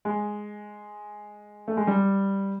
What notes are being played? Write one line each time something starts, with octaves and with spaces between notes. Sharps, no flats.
G#3
A3
G#3
G3